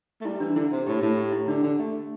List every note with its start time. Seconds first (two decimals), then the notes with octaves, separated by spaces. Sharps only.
0.21 A3
0.25 G3 E4
0.40 E3 D4
0.55 D3 E4
0.72 C3
0.87 A2 G4
1.02 A2
1.18 G4
1.32 E4
1.48 D3 D4
1.63 D3
1.79 A3